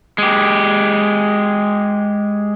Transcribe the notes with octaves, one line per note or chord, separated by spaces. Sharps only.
G#3 G4